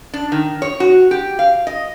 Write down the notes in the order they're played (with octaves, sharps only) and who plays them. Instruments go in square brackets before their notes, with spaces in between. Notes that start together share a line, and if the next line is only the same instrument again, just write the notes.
[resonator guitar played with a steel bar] D4
D#3
C#5
F#4
G4
F5
D#5